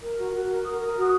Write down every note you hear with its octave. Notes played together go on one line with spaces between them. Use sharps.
A#4
F#4
F#4
A#4
A#4 D#6
A#4
F#4